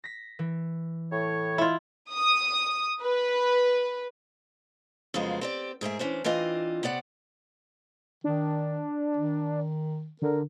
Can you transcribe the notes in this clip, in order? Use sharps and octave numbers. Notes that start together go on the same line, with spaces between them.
A#6 B6
E3
A2 C#5
E4 F4
D#6
B4
F2 C#3 F#3 G#3 B3 F4
C4 G4 D5
G#2 G#4 A#4 E5
E3 C#4 D4 C5
E3 C4 D4 F4 D#5
C3 B3 D5 F#5
D#3 D4
D#3
D3 A#4